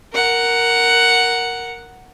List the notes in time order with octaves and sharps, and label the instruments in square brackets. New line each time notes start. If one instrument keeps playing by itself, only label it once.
[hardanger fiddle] A#4 F#5